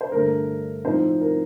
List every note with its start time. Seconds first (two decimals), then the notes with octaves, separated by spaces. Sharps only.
0.01 C5
0.12 G2 D3 A3 A#4
0.84 A2 F3 C4 D#4 C5
1.21 A#4